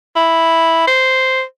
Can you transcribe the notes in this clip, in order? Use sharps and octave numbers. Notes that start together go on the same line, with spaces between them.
E4
C5